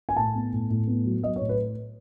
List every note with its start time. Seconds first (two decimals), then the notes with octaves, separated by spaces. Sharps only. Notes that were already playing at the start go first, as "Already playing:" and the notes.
0.09 G#5
0.16 A2 A5
0.35 B3
0.53 A2
0.70 A2
0.87 B3
1.05 F#3
1.22 F#3 D#5
1.36 C#5
1.40 A2
1.49 B4